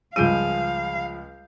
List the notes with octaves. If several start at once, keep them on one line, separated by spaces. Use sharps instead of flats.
C#2 F3 G3 F4 G#4 F5 G6 D#7